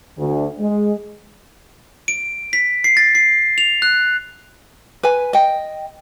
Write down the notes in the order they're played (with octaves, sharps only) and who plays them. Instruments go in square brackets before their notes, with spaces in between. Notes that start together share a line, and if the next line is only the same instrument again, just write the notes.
[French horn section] D2
G#3
[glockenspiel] D7
B6
C7
A6
C7
F7
F#6
[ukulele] B4 G#5
D#5 G5